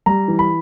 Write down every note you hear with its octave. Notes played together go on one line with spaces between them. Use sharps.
G3 A#5
E3
B5